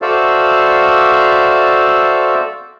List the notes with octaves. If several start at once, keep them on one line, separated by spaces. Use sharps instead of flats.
F#4 A4 C5 D5 E5 F5